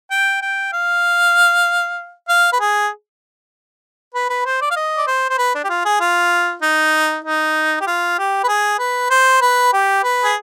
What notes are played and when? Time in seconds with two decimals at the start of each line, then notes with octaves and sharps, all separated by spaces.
0.11 G5
0.42 G5
0.73 F5
2.29 F5
2.53 B4
2.60 G#4
4.14 B4
4.29 B4
4.45 C5
4.61 D5
4.71 F5
4.76 D#5
4.98 D5
5.07 C5
5.30 C5
5.38 B4
5.55 D4
5.64 G4
5.70 F4
5.85 G#4
6.00 F4
6.62 D#4
7.25 D#4
7.81 G4
7.87 F4
8.18 G4
8.44 B4
8.48 G#4
8.79 B4
9.10 C5
9.42 B4
9.73 G4
10.04 B4
10.24 G#4